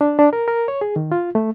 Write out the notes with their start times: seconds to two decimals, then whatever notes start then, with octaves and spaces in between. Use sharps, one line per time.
0.01 D4
0.19 D4
0.33 A#4
0.48 A#4
0.68 C#5
0.81 G#4
0.96 D#3
1.12 F4
1.35 A3